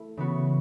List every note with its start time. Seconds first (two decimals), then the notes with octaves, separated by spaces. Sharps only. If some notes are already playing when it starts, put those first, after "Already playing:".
Already playing: A3 E4
0.17 C#3 E3 B3 F#4